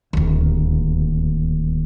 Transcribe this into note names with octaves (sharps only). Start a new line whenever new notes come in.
D1 D#2